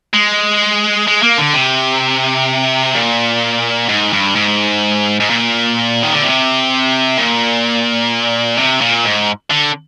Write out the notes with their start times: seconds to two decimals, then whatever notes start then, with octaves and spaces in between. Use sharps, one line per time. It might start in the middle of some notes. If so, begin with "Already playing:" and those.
0.13 G#3
1.08 G#3
1.23 A#3
1.38 D3
1.54 C3
2.95 A#2
3.89 G#2
4.13 G2
4.35 G#2
5.20 G#2
5.30 A#2
6.03 D#3
6.12 D3
6.23 C3
7.17 A#2
8.57 C3
8.81 A#2
9.04 G#2
9.51 D3